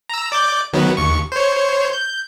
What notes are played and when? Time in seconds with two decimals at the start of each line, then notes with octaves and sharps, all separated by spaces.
0.09 A#5 E6
0.32 D5 D6 G6
0.73 D#3 F#3 B3
0.97 D#2 C#6
1.32 C5 C#5
1.93 G6